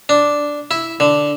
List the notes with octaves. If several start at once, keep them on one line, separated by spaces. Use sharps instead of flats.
D4
E4
D3